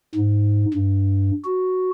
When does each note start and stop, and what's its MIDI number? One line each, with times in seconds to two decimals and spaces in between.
0.15 0.65 44
0.74 1.31 43
1.45 1.91 66